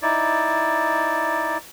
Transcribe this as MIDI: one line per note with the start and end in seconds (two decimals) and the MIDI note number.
0.02 1.57 63
0.02 1.57 64
0.02 1.57 74